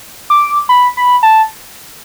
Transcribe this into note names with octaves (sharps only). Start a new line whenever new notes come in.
D6
B5
B5
A5